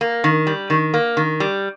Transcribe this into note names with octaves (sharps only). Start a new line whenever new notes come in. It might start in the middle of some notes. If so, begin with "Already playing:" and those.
A#3
D#3
G3
D#3
A#3
D#3
G3